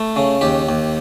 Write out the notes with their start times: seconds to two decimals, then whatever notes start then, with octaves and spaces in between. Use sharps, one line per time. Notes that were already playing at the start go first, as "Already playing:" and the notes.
Already playing: A3
0.16 C#3
0.41 D#2 G4
0.69 D#2